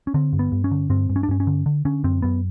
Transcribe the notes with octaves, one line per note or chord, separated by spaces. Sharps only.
C#4
D3 C4
G2
B3
G2
C#4
D3
G2 C4
G2
C#4
D4
G2 C#4
C#4
D3
D3
D3 C#4
F#2 C4
F#2 B3